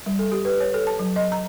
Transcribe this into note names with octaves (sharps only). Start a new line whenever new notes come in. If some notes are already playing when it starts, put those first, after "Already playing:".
G3
A4
G4
B4
C#5
A4
A5
F#3
D#5
A#5